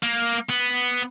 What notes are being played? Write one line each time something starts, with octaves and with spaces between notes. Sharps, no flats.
A#3
B3